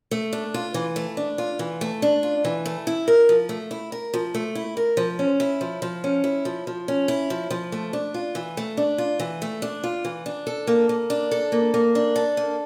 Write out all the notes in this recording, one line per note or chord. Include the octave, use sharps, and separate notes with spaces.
A3
D4
F4
E3
A3
D4
F4
E3
A3
D4
F4
E3
A3
E4
A#4
F3
A3
E4
A#4
F3
A3
E4
A#4
F3
C#4
E4
F3
F3
C#4
E4
F3
F3
C#4
E4
F3
F3
A3
D4
F4
E3
A3
D4
F4
E3
A3
D4
F4
E3
D4
A4
A#3
A#3
D4
A4
A#3
A#3
D4
A4
A#3